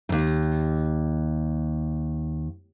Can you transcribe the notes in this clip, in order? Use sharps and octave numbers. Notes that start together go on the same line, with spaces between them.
D#2 G#2